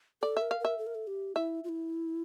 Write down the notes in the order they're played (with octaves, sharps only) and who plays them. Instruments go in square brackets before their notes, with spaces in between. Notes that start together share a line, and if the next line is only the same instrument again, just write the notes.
[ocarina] A4 [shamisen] D5
[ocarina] A#4 [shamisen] E5
[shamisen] F5
[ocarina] A#4 [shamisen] E5
[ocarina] A4
A#4
A4
G4
[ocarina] E4 [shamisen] E5
[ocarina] F4
E4